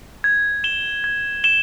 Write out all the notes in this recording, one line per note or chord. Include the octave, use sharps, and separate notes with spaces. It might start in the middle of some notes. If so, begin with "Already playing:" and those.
G#6
E7 G7
G#6
E7 G7